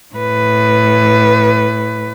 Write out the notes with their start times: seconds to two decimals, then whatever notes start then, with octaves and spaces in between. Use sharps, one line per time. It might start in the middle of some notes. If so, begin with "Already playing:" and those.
0.15 A2 B4